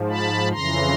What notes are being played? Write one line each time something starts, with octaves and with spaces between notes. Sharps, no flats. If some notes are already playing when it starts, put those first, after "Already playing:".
Already playing: G#2 F3
A5 B5
F2 C#3 E3 A#5 C6